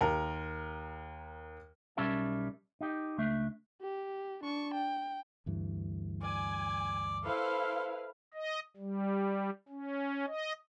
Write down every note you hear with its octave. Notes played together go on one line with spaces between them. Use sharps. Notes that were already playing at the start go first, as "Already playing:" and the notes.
D#2 A#4
B1 G3 C#4 A#4 E5 A5
D#4 G4
C#2 A3 D4 E5
G4
D4 C#6
G5
D2 G2 E3
D5 G#5
E4 A4 B4 C5 F5
D#5
G3
C#4
D#5